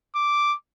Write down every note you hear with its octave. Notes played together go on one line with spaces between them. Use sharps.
D6